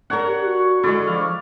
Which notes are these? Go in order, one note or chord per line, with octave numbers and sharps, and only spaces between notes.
D4 A#4 C#5 F#5
G4
F#4
D3 G#3 E4 D5 C#6
F3 F5